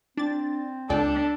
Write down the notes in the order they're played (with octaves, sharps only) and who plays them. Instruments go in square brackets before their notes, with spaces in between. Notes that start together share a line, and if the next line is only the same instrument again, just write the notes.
[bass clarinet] C4 [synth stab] D4 A6
[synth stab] C#2 D5 G5 [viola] D4 [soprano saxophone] A4